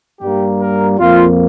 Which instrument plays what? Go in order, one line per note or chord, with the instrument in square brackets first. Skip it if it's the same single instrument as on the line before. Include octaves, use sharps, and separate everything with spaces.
[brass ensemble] G2 G3 A#3 G4
A#4
F2 F3 A#3 F4